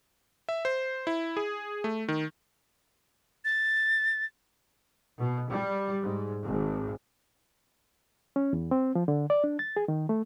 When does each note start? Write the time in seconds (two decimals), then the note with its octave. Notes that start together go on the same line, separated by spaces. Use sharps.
0.49 E5
0.65 C5
1.07 E4
1.37 G#4
1.84 A3
2.08 D#3
3.45 A6
5.18 B2
5.50 G3
6.01 G#2
6.44 G#1
8.36 C#4
8.53 E2
8.71 C4
8.95 F3
9.08 D3
9.30 D5
9.44 D4
9.59 A6
9.76 G#4
9.88 D#3
10.09 A3